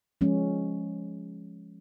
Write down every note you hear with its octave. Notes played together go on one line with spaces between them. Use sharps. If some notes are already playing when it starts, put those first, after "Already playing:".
F3 G#3 C#4